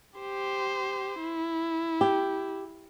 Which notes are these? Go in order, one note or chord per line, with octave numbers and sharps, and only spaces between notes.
G4 C5
E4
G4